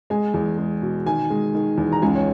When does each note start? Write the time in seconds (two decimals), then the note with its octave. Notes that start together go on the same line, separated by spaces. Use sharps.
0.10 G#3 G#5
0.34 E2
0.58 G#3
0.82 B2
1.06 D#3 G#5
1.30 G#3
1.55 D#3
1.78 E2
1.92 A#5
2.02 C#2 G#5
2.15 C#5